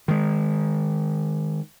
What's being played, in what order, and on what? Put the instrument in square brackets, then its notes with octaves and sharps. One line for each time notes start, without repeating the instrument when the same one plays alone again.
[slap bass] D#3 G#3